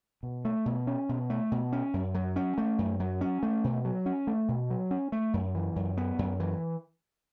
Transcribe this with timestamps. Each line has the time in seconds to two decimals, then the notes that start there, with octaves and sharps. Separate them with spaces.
0.23 B2
0.45 A3
0.66 B2
0.87 C#4
1.09 B2
1.30 A3
1.52 B2
1.73 C#4
1.94 F#2
2.14 F#3
2.36 C#4
2.58 A3
2.79 F#2
3.00 F#3
3.21 C#4
3.43 A3
3.64 B2
3.85 F#3
4.06 C#4
4.27 A3
4.48 B2
4.70 F#3
4.91 C#4
5.12 A3
5.34 F#2
5.55 E3
5.76 F#2
5.97 B3
6.19 F#2
6.40 E3